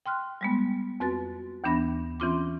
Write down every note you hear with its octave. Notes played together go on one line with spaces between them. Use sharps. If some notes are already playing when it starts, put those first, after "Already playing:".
G5 C6 F6 F#6
G3 G#3 B3
F2 C4 F#4 B4 A6
D#2 E3 B3 D4 B5 A#6
E3 C4 C#4 F4 C6 D6